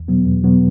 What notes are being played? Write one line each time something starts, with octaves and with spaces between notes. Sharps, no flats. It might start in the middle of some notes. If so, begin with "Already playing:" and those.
Already playing: E2
B2 F#3 B3
E2
B2 F#3 B3